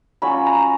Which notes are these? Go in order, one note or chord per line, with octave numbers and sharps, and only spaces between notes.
F#3 C#4 F4 B5
A#5